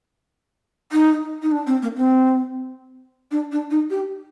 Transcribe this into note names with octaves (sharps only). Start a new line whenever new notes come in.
D#4
D#4
D4
C4
A#3
C4
D4
D4
D#4
G4